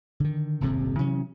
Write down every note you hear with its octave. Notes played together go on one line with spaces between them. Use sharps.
D3 D#3
D#1 G#1 F2 C3
C3 E3 F#3 C#4